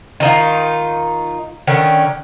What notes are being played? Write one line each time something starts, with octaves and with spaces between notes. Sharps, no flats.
D#3 D#4 F4
D3 D#3 C#4